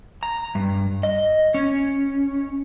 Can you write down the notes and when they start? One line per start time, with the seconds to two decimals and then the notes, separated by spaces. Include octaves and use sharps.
0.23 A#5
0.55 G2
1.03 D#5
1.54 C#4